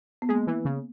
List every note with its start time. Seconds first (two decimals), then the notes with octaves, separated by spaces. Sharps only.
0.22 B3
0.29 G#3 A#3
0.47 E3
0.65 C#3